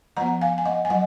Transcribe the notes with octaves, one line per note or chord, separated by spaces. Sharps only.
F3 B3 F#5 A#5
F5 G#5
G#5
D#5 F#5
G#5
F#3 D#5 F#5